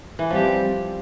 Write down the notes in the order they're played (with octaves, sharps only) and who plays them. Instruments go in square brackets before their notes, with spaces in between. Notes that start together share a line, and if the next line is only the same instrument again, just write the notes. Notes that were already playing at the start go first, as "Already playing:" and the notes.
[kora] E3
[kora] F3 [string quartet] G3 C4 G4